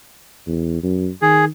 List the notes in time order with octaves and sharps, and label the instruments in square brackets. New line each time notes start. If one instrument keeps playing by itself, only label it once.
[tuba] E2
F#2
[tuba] D#3 [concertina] G#4